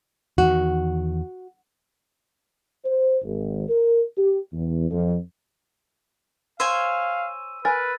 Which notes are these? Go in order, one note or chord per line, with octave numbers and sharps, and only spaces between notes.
E2 D#3 F#4
C5
G#1
A#4
G4
E2
F2
C5 C#5 F5 G#5 E6 D#7
A#4 B4 G#5 A6